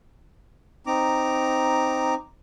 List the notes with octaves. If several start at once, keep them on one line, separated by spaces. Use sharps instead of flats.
C4 D#4 A#5 D6